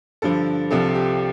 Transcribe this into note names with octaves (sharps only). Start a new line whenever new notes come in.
G2 D3 F3 A4
C2 C3 F3 A4
G4